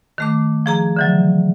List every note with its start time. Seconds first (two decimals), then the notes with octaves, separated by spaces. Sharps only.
0.18 D#3 A3 D6
0.66 F3 G#4 A#5
0.96 D3 E3 F#3